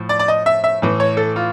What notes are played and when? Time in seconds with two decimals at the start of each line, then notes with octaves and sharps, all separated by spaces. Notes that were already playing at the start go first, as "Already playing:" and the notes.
Already playing: A2 F3
0.09 D5
0.19 D5
0.28 D#5
0.46 E5
0.64 E5
0.82 A2 E3
1.00 C#5
1.17 A4
1.36 F4